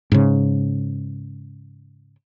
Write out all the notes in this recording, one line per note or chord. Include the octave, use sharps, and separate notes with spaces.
G#2 C#3